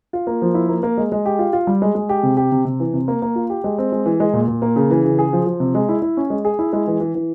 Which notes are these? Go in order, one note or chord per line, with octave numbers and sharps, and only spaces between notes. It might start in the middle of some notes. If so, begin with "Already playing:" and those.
F4
A#3
F3
E4
A#3
A#3
G#3
G#3
G4
F4
F4
G3
G#3
G#3
G4
C3
G4
C3
C3
E3
C3
A#3
A#3
F4
G4
G#3
C4
G#3
E3
G#3
A#2
A#2
A#3
C#3
E3
C#3
G#4
F3
F3
C3
G#3
E4
E4
C#4
G#3
G#4
E4
G#3
E3
E3
E3